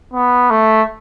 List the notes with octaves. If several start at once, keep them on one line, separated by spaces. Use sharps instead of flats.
B3
A3